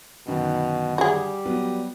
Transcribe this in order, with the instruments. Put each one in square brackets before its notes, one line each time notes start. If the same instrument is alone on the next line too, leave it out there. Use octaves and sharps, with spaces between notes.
[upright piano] F#2 D3 D#3 [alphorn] B2
[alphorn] G3 [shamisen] F#4 G#4
[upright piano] F#3 B3